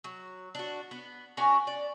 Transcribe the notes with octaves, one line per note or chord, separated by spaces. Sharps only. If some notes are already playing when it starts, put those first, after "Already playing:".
F#3
D4 F#4
B3
C#4 D4 F#4 A#4
D5